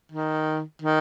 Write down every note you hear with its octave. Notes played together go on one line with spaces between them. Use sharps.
D#3
D#3